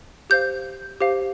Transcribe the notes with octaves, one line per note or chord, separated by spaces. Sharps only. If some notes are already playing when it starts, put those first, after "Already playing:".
G4 C5 F5 G6
G4 C5 F5